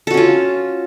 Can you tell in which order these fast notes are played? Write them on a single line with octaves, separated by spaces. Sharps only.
A4 F#4 C#4 F4